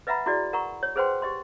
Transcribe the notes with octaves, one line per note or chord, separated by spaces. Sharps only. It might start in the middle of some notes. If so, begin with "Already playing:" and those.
B4 D#5 E5 F#5 A#5 B5
E4 F#4 G#4 D5 D#5
A#4 F#5 A#5 C#6
C#5
G#4 B4 C5 F#5 G5 C6
G4 D#5 C6